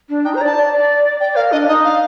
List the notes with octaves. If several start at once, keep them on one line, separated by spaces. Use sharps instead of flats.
D4
D#4 G5
C5 A#5
D5
A5
D5
D5
D5 G5
A#4 F5
D4 D#5
D#4 D#5
F5